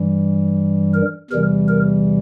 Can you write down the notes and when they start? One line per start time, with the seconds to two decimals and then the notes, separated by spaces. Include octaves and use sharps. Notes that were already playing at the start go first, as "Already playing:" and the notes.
Already playing: G2 E3 G3
0.94 A#4
1.30 E2 C3 E3 G3 A#4
1.68 A#4